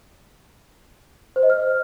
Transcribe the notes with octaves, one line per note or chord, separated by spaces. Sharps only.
C5
D#5
F6